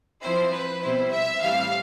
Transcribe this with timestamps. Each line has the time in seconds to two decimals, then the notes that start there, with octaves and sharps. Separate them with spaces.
0.22 F3 C4 E4 C5
0.52 B4
0.82 B2 G3 C4 E4 C5
1.11 E5
1.40 A2 E3 G3 C4 F5